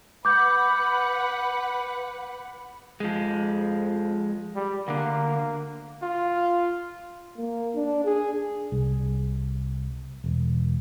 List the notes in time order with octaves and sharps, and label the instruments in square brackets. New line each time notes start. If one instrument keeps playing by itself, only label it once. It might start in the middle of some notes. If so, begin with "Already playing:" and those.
[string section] B4 F#5 B5 [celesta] D6 G6
[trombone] F2 [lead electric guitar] F3 G#3
[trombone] G3
[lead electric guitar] D2 D3 [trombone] A#3
[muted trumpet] F4
[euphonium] A#3
D4
G#4
[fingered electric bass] C2
E1